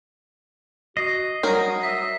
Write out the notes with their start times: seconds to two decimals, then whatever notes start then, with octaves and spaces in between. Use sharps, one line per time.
0.97 F#4 D#5 C7
1.43 F#3 G3 A#4
1.83 E5 B6